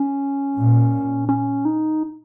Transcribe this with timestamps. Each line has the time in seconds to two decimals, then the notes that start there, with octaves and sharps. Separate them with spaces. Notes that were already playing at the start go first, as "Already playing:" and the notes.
Already playing: C#4
0.57 A#2
1.29 C#4
1.65 D#4